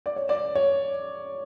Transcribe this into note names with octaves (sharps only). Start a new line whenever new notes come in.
D5
C#5
D5
C#5